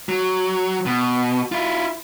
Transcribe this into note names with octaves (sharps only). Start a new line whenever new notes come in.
F#3
B2
E4 F4